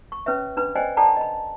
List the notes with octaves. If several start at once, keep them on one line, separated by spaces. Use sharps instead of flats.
C#6
C#4 B4 C#5 E5
D4 B4 B5
C5 D5 D#5 G5 G#5
A4 D5 G5 A5 A#5
D#5 B5